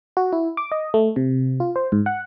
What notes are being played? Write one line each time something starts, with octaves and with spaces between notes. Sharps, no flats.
F#4
E4
D6
D#5
A3
C3
F4
C5
G#2
F#5